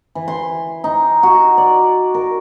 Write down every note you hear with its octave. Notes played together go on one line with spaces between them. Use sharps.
E3
C6
D#4
F#4
D5
A#4